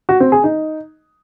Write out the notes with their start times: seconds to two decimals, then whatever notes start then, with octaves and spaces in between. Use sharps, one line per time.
0.09 F#4
0.20 C4
0.32 G#4
0.44 D#4